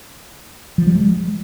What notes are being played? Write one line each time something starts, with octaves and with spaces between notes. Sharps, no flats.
F3
G3
G#3